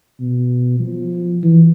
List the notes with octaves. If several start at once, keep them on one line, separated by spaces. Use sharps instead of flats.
B2
F3
E3